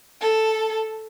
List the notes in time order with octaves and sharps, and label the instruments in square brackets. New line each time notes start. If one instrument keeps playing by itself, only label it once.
[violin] A4